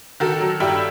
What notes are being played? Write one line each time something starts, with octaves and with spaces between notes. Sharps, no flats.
D#3 F#4 A4
F#3
G2 E4 G4